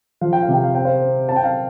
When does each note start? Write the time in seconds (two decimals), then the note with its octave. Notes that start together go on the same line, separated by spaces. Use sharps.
0.21 F3 F5
0.33 G5
0.43 F5
0.49 C3 G5
0.64 F5
0.75 C4 G5
0.85 C5 F5
1.02 C4
1.28 C4 A5
1.36 G5
1.43 F5 A5